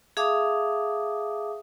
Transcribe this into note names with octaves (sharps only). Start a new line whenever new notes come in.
G#4 E5 F5 A5 D6 D#6